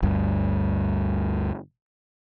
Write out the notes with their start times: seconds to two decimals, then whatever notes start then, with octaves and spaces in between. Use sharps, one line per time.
0.03 G1 D2 G2